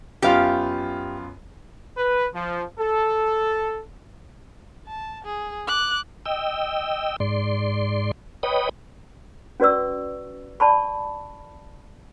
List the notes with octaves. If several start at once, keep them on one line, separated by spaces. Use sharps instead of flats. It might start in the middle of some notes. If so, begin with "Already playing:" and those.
F#2 B3 F4 G4 F5
B4
F3
A4
A5
G#4
D6 F#6
D#5 G5 E6
G#2 D5 C6
B4 C#5 D#5 G5 B5 D#6
C#4 F#4 B4 D5 C#6 E6
D5 A5 B5 C#6